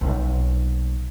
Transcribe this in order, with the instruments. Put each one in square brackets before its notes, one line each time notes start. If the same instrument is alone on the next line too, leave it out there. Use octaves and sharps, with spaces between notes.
[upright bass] B1 A#2